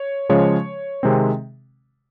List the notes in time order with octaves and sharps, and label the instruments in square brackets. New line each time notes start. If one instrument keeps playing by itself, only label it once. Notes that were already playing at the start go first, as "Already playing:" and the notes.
Already playing: [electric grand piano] C#5
C#3 F3 G#3 C#5
C3 D#3 G#3 C4